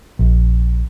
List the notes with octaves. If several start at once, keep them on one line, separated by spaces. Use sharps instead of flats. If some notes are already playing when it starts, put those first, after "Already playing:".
A#1